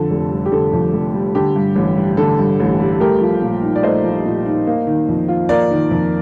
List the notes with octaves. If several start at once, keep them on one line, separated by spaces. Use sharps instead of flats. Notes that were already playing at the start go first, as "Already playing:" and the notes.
Already playing: F2 D3 A4
F1
G3
G4
D3 A4
F2
F1
G3
D3 G4
G2
A1
G3
D3 A4
G2
A1
G3
A3 G4 A#4
F3
A#2
D#4
D5
A3 C5 D#5
F3
A#2
D#4
A#3
D#3
F2
F4
A#3 A#4 D5
D#3
F2